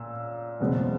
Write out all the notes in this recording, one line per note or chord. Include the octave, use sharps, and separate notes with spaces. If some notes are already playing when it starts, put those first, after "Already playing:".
Already playing: A#2 E6
F#1 E2 B2 G#3 C4